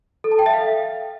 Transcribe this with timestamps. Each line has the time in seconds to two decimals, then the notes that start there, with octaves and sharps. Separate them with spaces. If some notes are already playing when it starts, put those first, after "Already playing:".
0.24 A4
0.32 A5
0.39 G5
0.46 E5
0.53 F5